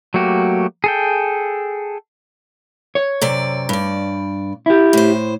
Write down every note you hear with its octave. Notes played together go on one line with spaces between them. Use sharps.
F#3 A3 A#3 F#4 G4
G#4 A4 G5
C#5
F#2 C3 D5
G2 D5
E4 G4
A2 C5